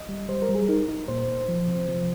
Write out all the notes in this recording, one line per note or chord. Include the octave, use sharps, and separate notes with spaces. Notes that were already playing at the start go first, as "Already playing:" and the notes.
Already playing: D#5
G3
G3 C5
A#4
G3
G#4
D#4 A#4
D#4
A#2 C5
A#2
F3
C3
F3